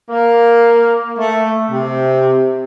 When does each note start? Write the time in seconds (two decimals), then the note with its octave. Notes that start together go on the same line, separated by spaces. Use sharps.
0.08 A#3
1.18 A3
1.71 C3